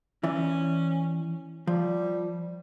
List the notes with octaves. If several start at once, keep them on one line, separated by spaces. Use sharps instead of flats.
E3 C#4 E4 D5
F3 G3